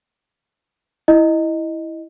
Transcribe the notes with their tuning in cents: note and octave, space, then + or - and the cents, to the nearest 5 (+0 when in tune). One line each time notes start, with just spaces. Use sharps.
E4 -5 D#5 +0